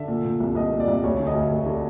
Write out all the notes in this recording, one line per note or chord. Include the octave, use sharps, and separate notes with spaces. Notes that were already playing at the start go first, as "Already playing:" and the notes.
Already playing: D3 E5
A#2
A#2
C2
C2 D#5
A#2
D5
C2
D5
D2 C#5
D3
D#5
D2
D2
D3